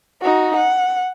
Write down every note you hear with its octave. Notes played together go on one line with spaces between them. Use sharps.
D#4 F#4
F#5